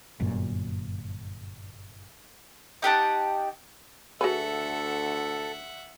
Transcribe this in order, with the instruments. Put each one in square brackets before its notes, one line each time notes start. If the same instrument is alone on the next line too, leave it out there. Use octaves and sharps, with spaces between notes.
[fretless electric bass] G1 F#2 A#2
[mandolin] D#4 G4 F#5 A5
[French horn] D2 [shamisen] F#4 G#4 B4 [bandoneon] A4 [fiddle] E5 F#5